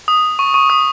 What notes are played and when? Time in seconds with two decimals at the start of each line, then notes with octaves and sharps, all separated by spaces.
0.08 D#6
0.39 C#6
0.54 C#6
0.70 D#6